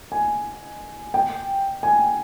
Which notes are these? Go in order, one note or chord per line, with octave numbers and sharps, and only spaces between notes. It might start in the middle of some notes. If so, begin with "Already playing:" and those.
G#5
G5
G#5